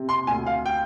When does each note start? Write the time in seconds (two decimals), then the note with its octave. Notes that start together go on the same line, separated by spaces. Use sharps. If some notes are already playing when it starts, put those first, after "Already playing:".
Already playing: C3
0.09 C6
0.27 D2 G#5
0.46 F5
0.66 G5